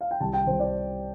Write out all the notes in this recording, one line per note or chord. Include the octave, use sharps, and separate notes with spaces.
F5
G5
C2 A5
G5
C2 C5
D5